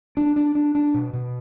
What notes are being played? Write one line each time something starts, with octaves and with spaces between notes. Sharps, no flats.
D4
D4
D4
D4
B2
B2